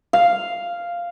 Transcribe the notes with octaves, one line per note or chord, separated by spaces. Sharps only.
F5